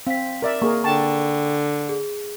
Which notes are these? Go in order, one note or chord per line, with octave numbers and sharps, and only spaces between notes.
C4 F5 B6
A#4 D5 E5
A#3 G#4 A#4 C#6
D3 G5 A5 C#6
G#4